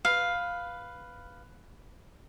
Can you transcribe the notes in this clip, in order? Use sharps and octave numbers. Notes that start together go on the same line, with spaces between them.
B4 F5